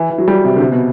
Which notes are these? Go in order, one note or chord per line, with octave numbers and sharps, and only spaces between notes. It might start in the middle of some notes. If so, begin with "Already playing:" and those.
Already playing: E3
E3
F#3
G3
C3
D3
C3
B2